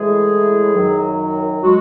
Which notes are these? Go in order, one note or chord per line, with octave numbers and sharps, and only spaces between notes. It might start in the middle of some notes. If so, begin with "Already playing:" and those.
Already playing: A2 E3 G#3 G#4
F#2 D#3 F#3
G#3 F#4